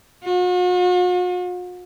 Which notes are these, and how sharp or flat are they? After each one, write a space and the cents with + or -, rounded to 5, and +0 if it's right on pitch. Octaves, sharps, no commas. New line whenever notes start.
F#4 -45